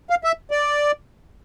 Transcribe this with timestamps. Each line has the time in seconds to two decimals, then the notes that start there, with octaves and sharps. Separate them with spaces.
0.10 F5
0.24 E5
0.51 D5